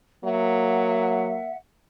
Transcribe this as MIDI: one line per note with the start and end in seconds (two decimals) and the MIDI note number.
0.24 1.38 54
0.24 1.51 58
0.24 1.55 76
0.24 1.55 78